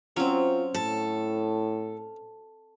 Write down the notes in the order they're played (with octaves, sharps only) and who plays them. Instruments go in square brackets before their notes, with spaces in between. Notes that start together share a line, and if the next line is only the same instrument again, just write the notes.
[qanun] F#3 C4 [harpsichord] C#4 [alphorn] F4
[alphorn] A2 [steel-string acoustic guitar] A4